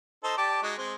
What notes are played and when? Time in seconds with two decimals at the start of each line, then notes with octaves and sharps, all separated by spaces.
0.24 D#4 A4 C5
0.37 G4 D5 A5
0.63 G#3 D#4 F#4
0.78 G#3 C4